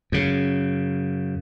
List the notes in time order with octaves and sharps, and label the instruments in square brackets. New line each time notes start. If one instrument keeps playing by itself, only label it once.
[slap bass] F#2 C#3